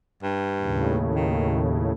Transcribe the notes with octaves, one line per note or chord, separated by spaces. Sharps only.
G2
D#2 A2 C#3
D#3